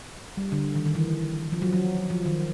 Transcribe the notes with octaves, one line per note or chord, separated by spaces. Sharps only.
G3
D3
D#3
D#3
E3
F3
F#3
F#3
F3
D#3